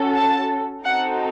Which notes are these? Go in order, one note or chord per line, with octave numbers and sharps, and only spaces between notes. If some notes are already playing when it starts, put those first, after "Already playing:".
Already playing: C#4 F#4 A4
A5
C4 D#4 F#4 A4 F#5